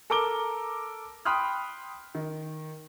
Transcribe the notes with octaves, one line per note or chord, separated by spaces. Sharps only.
A4 A#4 A#5 D6 D7 G7
G5 B5 C6 D#6 F6 F#6
D#3